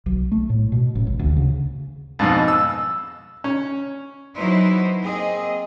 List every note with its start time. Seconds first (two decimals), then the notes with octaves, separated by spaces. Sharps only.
0.06 B1
0.32 A3
0.50 A2
0.72 B2
0.95 A1
1.07 C#2
1.19 D2
1.36 C#3
2.19 F2 G#2 B2
2.48 E6
3.44 C#4
4.37 E3 F#3 D#4 E4 B4 C5
5.03 A#3 C4 G#4 D#5